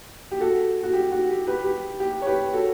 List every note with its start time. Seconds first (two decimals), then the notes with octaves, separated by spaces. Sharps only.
0.31 G4
0.40 F#4 A4
0.83 F#4
0.93 G4
1.12 F#4
1.29 G4
1.47 G4 B4
1.64 G4
2.00 G4
2.22 C#5
2.27 G4 B4
2.53 F#4 A4